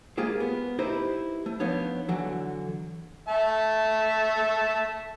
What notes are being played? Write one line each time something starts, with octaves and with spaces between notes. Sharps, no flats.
G#3 A#3 F4 G4 G#4 C5
B3
D#4 E4 G4 B4 C5 D#5
A3
F3 B3 D4 D#4 C#5
D3 E3 F#3
E5 A5